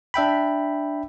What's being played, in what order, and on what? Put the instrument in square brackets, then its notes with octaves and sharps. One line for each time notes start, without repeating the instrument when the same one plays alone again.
[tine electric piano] D4 E5 G5 B5